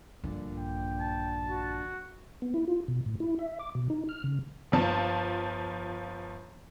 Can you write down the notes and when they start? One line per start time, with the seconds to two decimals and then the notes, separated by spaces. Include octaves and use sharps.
0.24 A#1 G2 A#2 D3
0.57 G5
1.00 A5
1.48 F#4
2.42 B3
2.54 E4
2.68 F4
2.88 B2
3.06 A2
3.20 E4
3.39 E5
3.59 D6
3.75 B2
3.90 D#4
4.09 F6
4.24 C#3
4.72 G1 F3 A5